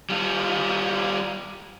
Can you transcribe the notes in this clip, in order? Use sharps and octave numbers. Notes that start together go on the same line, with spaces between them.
G3 F4